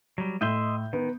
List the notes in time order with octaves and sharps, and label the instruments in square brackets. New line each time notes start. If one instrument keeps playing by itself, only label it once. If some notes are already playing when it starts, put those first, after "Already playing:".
[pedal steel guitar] F#3 G3
[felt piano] A2 G6 [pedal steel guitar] D#5 E5 C6
[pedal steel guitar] D#3 [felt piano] B3